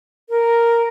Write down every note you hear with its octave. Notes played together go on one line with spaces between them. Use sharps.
A#4